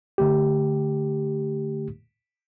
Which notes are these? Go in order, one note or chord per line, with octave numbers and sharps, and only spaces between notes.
D3 A3 G4